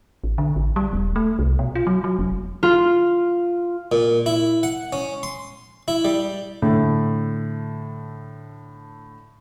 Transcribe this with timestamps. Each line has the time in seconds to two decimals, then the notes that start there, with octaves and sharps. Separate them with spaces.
0.24 A1
0.38 D3
0.56 A1
0.76 G3
0.93 D#1
1.16 A3
1.39 C2
1.59 B2
1.75 F4
1.87 F#3
2.04 F#3
2.19 F1
2.63 F4
3.92 A#2
4.26 E4
4.63 F#5
4.93 C#4
5.23 C6
5.88 E4
6.05 G3
6.62 A2 D3 A3